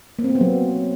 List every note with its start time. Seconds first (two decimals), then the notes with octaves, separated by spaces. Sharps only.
0.19 A#3
0.24 C4
0.30 A#3
0.35 B3
0.41 F#3